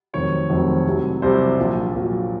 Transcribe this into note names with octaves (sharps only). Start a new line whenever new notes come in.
F1 F2 D#3 F#3 C4 C#5
F1 F2 D#3 F#3 C4
C2 C3 F#3
C2 C3 F#3 C5
A#1 A#2 F#3
A#1 A#2 F#3